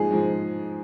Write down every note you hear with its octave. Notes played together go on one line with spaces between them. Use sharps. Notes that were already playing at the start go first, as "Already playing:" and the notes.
Already playing: G#2 F3 G#3 G#4
G#2 F3 G#3